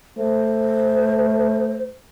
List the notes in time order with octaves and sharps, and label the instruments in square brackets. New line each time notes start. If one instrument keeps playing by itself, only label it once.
[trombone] A3 [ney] C5